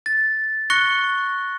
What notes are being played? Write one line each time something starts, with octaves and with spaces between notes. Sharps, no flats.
A6
C#6 F#6 A#6 C#7 G7